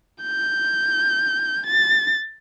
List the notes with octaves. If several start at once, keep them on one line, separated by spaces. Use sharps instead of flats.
G6
A6